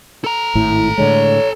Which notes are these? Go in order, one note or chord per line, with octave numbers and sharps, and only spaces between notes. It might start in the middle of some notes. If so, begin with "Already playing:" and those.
A4 A#5
G#1 A2 E4
A2 D3 G#3 C#5